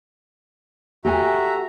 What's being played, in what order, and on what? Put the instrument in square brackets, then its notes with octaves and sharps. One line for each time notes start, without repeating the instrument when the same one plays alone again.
[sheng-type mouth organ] F#4 E5 A#5 [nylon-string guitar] G4 A4 G#5